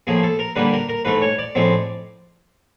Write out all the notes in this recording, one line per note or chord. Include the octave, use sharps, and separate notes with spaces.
A2 F3 A#3 G#4
A4
A#4
D3 G3 A#3 D4 B4
A#4
A#4
G#2 E3 A3 B4
C#5
D5
A2 F3 G#3 C4